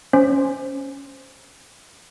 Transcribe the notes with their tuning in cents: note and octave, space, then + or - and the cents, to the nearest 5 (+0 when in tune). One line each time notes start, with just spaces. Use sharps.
C#4 +5 C5 +0